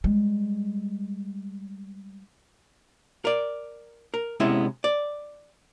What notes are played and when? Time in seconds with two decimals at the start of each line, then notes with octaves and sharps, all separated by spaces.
0.04 G3 G#3
3.25 A#4 D5
4.14 A#4
4.40 C3 G#3 B3 C#4 E4
4.84 D5